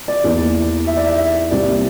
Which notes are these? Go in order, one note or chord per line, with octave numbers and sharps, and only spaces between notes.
D5
E2 E3 A#3
E5
D5
E5
C2 C3 G3 A#3 D5